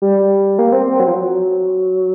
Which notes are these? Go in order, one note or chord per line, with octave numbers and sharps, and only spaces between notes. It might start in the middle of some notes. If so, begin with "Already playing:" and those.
G3
A#3
C4
C4
F#3
F3
F#3